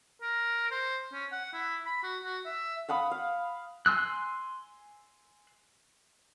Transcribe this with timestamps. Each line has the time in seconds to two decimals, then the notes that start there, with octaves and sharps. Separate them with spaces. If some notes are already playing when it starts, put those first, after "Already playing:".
0.22 A#4
0.71 C5
1.13 C#4
1.32 F#5
1.53 E4
1.85 B5
2.03 F#4
2.24 F#4
2.45 E5
2.88 F5 F#5 B5 D#6
3.11 F5
3.86 G#5 C6 E6 F#6